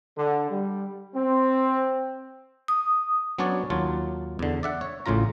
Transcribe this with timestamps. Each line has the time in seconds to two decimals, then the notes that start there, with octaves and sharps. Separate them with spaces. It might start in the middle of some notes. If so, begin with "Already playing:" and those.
0.17 D3
0.50 G3
1.15 C4
2.68 D#6
3.38 F#3 B3 C#4 D4 C#5 D5
3.70 D#2 F#3 F4 A5
4.39 E2 D3
4.63 D5 E5 F#5
4.81 C#5
5.06 A1 A2 C#3 F4 A#5